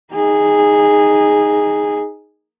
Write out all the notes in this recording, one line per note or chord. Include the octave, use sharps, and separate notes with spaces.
D#4 G#4